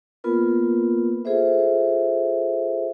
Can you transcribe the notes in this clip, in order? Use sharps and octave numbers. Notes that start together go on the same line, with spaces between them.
A#3 B3 F4 A#4 B4
F4 G#4 A4 C5 E5